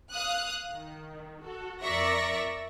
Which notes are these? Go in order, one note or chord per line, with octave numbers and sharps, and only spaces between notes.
F5 D#6 F#6
D#3
F#4 A4
F2 A#4 D5 E5 C#6 A#6